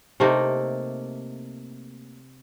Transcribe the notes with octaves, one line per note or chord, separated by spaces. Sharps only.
C3 A3 A#3 D#4